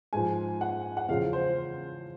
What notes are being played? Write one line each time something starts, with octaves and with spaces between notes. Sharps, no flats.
G#2 F3 G#5
F#5
F#5
E2 C#3 F3 F5
C5